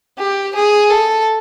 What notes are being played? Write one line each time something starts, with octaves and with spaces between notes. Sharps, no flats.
G4
G#4
A4